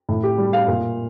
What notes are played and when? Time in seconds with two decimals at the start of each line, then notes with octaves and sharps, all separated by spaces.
0.09 A2
0.23 G4
0.38 G3
0.53 F5
0.68 A#2